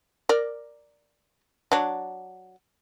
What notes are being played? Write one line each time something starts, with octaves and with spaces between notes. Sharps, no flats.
A#4 D5
F#3 D4